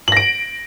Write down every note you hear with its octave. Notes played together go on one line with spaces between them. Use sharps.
A#6 D7 F#7